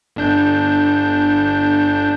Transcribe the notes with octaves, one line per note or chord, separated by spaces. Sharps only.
G1 D4 G6